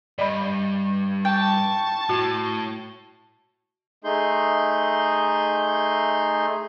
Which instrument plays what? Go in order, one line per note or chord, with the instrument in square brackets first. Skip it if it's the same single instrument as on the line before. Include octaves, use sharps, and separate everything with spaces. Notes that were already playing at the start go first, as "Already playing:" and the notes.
[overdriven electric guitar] G2 [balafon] D5 D#5 B5
[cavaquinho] G5 [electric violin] A5 C#6
[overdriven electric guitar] A2 [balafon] F#4
[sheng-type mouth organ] A3 D#4 G#4 C6 G6